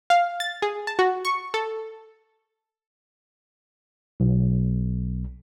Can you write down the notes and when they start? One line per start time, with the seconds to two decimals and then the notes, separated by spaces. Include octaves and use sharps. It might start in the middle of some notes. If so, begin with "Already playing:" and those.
0.10 F5
0.40 A6
0.62 G#4
0.87 A5
0.99 F#4
1.25 C#6
1.54 A4
4.20 B1